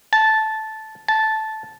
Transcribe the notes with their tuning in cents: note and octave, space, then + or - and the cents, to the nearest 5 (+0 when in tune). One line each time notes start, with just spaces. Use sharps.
A5 -10
A5 -10